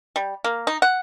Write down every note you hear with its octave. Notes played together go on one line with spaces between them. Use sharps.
G3
A#3
D#4
F#5